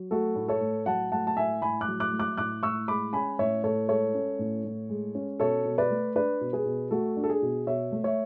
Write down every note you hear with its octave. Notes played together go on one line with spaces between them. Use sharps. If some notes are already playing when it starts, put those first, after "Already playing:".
Already playing: F#3
A3 F#4 A4
A2
A4 C#5
A2
F#3 F#5 A5
A3 F#5 A5
A5
A2 E5 G#5
A2 G#5 B5
D6 F#6
F#3
D6 F#6
A3
D6 F#6
A2 D6 F#6
A2 C#6 E6
G#3 B5 D6
C#4 G#5 B5
A2 C#5 E5
A2 A4 C#5
G#3 A4 C#5
C#4
A2
A2
G#3
C#4
B2 A4 C#5
B2
B4 D5
A3
D4 B4 D5
B2
G#4 B4
B2
A3 F#4 A4
D4
A4
G#4
B2
B2 C#5 E5
A3
C#5 E5